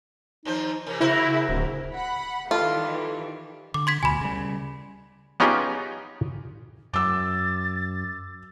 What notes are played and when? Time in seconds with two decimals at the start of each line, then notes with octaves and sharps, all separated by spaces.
0.45 D#2 F3 D#4 C5
0.86 C3 E3 A#4
1.01 C#3 E4 F#4 A#4 C5
1.31 G#4
1.49 D1 C#3
1.95 F#5 B5
2.51 D#3 E3 G3 F4 A4
3.74 D3 D6
3.87 C6 G#6 B6
4.03 D2 B2 G#5 B5
4.21 C#3 G3
5.40 B3 C#4 D#4 F4 G4 G#4
6.94 F#2 D6 E6 A6